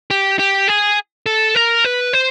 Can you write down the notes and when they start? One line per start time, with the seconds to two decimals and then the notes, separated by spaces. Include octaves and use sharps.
0.11 G4
0.39 G4
0.68 G#4
1.26 A4
1.55 A#4
1.85 B4
2.13 C5